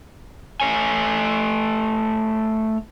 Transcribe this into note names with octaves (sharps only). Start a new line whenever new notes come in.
A3 C#5 G#5